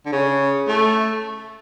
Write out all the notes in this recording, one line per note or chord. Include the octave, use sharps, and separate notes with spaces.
D3
C#3
A3